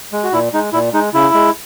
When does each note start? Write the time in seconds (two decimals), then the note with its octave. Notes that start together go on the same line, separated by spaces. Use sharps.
0.12 G#3
0.24 F#4
0.33 A#2 E4
0.53 G#3 D#4
0.73 A#2 E4
0.93 G#3 D#4
1.14 C#3 E4
1.34 G#3